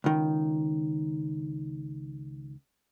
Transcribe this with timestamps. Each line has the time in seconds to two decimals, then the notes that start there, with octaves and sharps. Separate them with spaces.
0.04 C#2 D#3